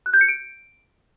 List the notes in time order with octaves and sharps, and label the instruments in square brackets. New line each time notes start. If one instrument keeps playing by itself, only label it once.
[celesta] F#6
G6
C#7
D7